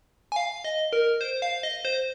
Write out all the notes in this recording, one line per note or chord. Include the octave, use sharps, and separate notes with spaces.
G#5
F5
D#5
A#4
C5
F5
D#5
C5